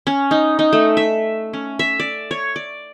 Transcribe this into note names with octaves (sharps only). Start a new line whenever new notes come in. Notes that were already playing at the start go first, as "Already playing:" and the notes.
C#4
D#4
D#4
A3
E5
C#4
E5
D5
C#5
D5